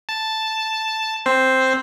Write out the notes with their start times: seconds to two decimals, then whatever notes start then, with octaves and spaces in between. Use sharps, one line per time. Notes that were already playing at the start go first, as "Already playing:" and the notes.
0.09 A5
1.26 C4 C5